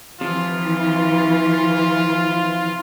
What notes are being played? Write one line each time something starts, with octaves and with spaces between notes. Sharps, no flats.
C3 E3 F3 F4